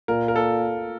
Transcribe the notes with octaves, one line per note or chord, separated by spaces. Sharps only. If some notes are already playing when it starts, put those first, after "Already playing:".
A#2 A#4
A#4
A4